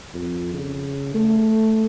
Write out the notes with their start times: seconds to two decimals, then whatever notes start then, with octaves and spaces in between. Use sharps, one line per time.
0.14 F2
0.53 C#3
1.15 A3